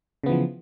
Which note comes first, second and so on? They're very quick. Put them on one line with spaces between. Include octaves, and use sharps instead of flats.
C#3 B3 E3 F3